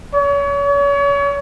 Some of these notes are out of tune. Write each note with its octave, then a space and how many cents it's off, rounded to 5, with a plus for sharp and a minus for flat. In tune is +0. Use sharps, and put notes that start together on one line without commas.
C#5 +35